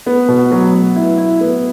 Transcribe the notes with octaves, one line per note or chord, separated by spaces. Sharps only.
B3
B2
F#3
F#3
E4
E4
B3